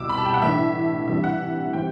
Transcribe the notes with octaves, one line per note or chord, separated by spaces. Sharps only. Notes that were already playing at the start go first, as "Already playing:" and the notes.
Already playing: C2 B2 G3 D6 E6
B5
A5
G5
F#5
A2 E3 A3 D4 E5
C3 E3 G3 D4 E5
F#5
E3 G3 C4 G5